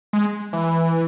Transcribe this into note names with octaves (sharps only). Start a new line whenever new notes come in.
G#3
E3